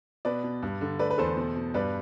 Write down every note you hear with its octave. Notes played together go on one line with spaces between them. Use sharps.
B2 B4 D5
B2
G2
D3
A3 B4 D5
B4
E2 A4 C5
B2
B2
G2 B4 D5